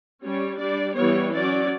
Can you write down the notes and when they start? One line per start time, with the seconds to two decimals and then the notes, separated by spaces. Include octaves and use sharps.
0.23 G3 C#4 C#5
0.59 G3 D4 D5
0.96 E3 G3 B3 C#5
1.33 F#3 C#4 D5